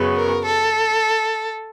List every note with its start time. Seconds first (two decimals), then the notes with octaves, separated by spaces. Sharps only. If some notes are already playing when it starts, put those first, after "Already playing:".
Already playing: F#2 C#3 F#3 B3
0.17 A#4
0.45 A4